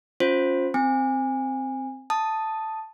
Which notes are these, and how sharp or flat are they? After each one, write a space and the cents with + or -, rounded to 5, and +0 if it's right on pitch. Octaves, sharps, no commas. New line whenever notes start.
C#4 +0 F4 +20 C5 +10
C4 +0 G#5 -25
A5 +0 D#6 +0